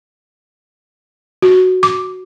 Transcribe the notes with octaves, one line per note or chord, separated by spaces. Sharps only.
F#4
D6